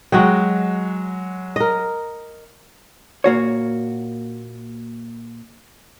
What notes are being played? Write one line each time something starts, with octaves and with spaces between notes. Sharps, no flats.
F#3 G#3 F#4 D#5 G5
A#4 D#5
A#2 A#3 F#4 C#5